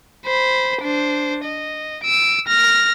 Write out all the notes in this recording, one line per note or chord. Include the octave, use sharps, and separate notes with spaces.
C5 B5
D4 C5
D#5
E6 D7
F6 A#6